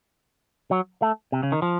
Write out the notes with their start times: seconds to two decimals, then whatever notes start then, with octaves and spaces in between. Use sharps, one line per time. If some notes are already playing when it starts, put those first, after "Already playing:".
0.71 F#3
1.02 A3
1.32 C3
1.43 C#3
1.52 D#3
1.62 F3